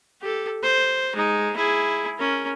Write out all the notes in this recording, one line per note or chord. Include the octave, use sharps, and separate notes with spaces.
G4 A4
C5
G#3 D#4
E4 G#4
C#4 A#4